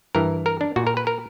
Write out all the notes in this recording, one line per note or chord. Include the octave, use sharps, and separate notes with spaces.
G2 E3 A#4
A#4
D4
A#2 F#4
A#4
B4
A#4